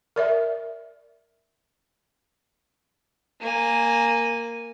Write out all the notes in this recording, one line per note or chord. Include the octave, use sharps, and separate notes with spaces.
A#4 D5 E5
A#3 G#5